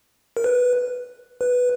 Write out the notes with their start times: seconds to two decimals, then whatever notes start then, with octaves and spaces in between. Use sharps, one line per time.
0.37 A#4
0.44 B4
1.41 B4